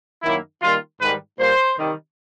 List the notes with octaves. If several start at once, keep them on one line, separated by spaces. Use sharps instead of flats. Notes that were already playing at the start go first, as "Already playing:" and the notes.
F#2 D#3 F#3 A#3 E4
D#3 G3 A#3 F4
G#2 D#3 G3 B4
A#2 G3 A#3 C5
C3 D#3 G3